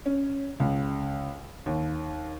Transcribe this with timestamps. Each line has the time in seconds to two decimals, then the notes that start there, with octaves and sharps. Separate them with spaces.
0.06 C#4
0.60 C#2
1.66 D#2